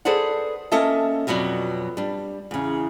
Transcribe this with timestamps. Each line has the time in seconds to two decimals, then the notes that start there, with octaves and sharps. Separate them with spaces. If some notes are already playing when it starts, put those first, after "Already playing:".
0.05 G#4 A4 B4 C5 D5 F#5
0.72 A#3 C#4 A4 D#5 E5 A5
1.27 F2 B2 F#3 B3 D5
1.97 G3 D4
2.51 E2 C#3